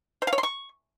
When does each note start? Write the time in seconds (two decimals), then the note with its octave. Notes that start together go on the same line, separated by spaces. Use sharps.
0.22 C5
0.27 F5
0.33 C#5
0.38 C6
0.43 C#6